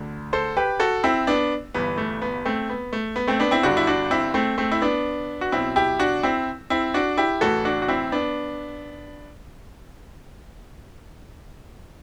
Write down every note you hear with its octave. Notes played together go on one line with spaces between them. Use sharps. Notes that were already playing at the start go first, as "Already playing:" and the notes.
Already playing: D2 D3
A4 C5
G4 B4
F#4 A4
C4 E4
B3 D4
G1 G2 E3 B3
A3
B3
A3 C4
B3
A3
B3
A3 C4
B3 D4
C4 E4
G1 G2 D3 D4 F#4
E4
D4 F#4
C4 E4
A3 C4
A3 C4
E4
B3 D4
F#4
B1 B2 C4 E4
E4 G4
D4 F#4
C4 E4
C4 E4
D4 F#4
E4 G4
A1 A2 E3 F#4 A4
D4 F#4
F#4
C4 E4
B3 D4